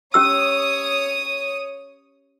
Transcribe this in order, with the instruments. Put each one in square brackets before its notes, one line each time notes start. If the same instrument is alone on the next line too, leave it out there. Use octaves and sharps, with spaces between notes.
[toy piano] C#4 G4 E6 [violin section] C#5 D#6